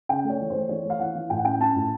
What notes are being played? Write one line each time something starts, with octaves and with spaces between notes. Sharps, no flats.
C#3 G5
A3
C#5
E3
A3 C5
E3 C#5
A3
F5
E3 F#5
E3
A2 G5
F#5
C#4 G5
C#4 A5
A2